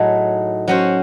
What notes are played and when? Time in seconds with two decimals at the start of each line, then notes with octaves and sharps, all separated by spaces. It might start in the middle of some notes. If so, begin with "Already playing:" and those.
Already playing: A2 F#3 A3 D#4 G#4
0.68 F#3 C#4 F#4 C5